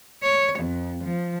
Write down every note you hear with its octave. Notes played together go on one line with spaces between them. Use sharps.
C#5
F2
F3